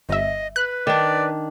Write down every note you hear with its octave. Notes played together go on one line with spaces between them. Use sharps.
G1 D#5 E5
B4 F#6
D#3 D4 D5